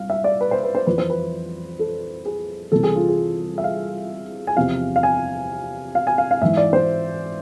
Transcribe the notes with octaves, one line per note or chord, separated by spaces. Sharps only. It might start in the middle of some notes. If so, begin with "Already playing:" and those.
Already playing: C2 F5
E5
D5
B4
C5
B4
C5
F2 E3 B4
C5
B4
A4
G#4
C2 C3 E3 A4
G#4
F4
G#4
E5
F5
G#5
E2 C3 F3 F5
F5
G#5
F5
G#5
F5
F5
G#2 E3 E5
D5
C5